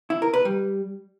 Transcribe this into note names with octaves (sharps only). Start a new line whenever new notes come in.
E4
A#4
B4
G3